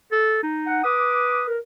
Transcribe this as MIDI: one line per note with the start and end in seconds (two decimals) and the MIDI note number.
0.12 0.43 69
0.43 0.83 63
0.66 0.84 78
0.84 1.57 71
0.84 1.42 86
0.84 1.42 87
1.48 1.58 70